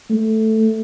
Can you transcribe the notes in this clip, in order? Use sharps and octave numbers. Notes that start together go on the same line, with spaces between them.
A3